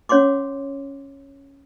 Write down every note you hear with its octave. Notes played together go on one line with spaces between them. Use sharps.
C#4 C#5 F#5 C6 D6